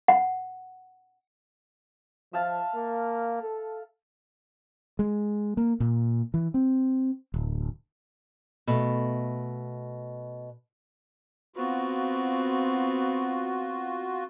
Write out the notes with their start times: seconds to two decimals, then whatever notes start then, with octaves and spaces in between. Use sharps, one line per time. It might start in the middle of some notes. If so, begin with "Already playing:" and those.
0.08 F#5
2.33 F3 E5 F5 A5
2.75 A#3
3.42 A4
4.99 G#3
5.57 A#3
5.80 A#2
6.34 E3
6.54 C4
7.34 D1
8.67 B2 A3
11.56 B3 C4 F4 F#4